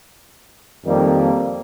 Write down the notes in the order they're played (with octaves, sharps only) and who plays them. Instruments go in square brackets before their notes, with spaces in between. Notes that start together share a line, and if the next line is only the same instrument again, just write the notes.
[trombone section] F2 D#3 G3 A#3